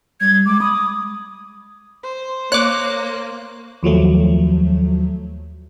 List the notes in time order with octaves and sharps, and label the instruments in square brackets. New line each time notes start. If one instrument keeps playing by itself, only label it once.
[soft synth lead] G3 [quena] G#6
[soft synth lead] G#3 [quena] D6
[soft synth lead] B5 [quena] D#6
[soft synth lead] D6
[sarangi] C5
[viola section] A#3 [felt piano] C#5 [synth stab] D6 F#6
[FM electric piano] D#2 F3 F#3 A3